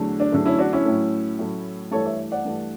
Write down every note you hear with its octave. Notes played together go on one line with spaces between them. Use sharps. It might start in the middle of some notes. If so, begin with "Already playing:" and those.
Already playing: E2 D3 F#3 A3
D4
E2 D3 F#3 A3
C#4 E4
D4 F#4
C#4 E4
A2 F#3 A3
A2 F#3 A3
G2 E3 A3 A4 C#5
C#5 E5
D5 F#5
G2 E3 A3